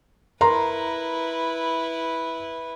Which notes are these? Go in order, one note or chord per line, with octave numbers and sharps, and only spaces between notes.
E4 A#4 B4 A#5 C6